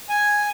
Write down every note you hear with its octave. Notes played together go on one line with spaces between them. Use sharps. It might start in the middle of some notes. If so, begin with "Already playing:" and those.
G#5